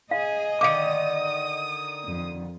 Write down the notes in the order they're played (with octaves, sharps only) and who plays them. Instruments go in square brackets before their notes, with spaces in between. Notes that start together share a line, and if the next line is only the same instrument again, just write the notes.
[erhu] G#4 [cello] D#5 [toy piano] F5
[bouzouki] D3 D#3 [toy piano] F5 D6 [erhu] D#6
[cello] F2